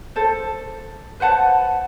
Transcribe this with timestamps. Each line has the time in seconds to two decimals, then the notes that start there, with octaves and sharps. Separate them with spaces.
0.16 A4 C5
1.20 B4 C5 F#5 A5